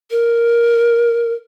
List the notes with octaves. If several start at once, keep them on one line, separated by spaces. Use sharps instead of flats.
A#4